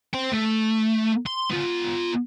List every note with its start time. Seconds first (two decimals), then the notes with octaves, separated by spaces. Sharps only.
0.14 C5 G5
0.32 A3
1.27 C6
1.51 B3 F4